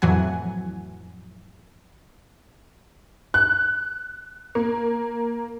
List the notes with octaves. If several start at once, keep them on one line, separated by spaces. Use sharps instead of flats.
F2 A2 E3 F#3 F#5 G#5
F#6
A#3